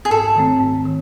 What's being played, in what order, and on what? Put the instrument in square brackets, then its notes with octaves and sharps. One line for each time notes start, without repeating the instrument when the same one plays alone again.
[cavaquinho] G#4
[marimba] G#2 [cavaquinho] A4
[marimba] D#3 A3 C4
G#2
D#3